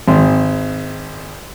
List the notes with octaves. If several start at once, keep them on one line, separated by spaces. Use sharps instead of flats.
G#1